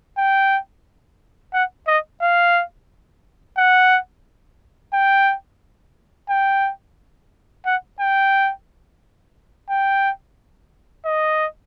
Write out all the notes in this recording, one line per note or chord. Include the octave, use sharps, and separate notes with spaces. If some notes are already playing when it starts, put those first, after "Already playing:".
G5
F#5
D#5
F5
F#5
G5
G5
F#5
G5
G5
D#5